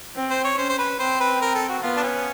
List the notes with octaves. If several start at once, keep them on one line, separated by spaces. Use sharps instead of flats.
C4
C5
C#5
C#4 C5
C5
B4
C4 C5
B4
A#4
A4
F#4
B3 F4
D4
C#4